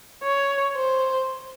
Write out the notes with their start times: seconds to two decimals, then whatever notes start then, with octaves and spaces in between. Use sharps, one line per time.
0.23 C#5
0.77 C5